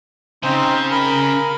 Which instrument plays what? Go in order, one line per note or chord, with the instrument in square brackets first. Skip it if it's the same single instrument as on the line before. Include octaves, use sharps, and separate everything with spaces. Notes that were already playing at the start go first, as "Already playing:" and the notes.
[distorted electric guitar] C#3 [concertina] C4 D#4 C5
[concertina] A#4 B5